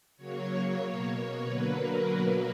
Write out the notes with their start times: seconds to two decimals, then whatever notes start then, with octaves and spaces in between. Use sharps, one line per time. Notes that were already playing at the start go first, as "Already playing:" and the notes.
0.17 C#3 F#3 A#3 C#5
0.81 B2 A#3
1.44 D3 F#3 A#3 B4
1.76 A#4
2.07 B2 F#3 A#3 B4